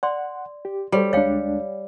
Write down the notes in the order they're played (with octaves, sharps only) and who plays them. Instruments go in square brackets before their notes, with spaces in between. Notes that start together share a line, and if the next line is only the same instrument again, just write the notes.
[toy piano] D5 C6 [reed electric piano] F#5
[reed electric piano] G4
[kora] G3 [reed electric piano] A4 C5 C#5
[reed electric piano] D2 G#3 D4 [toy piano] C#5 F5 G5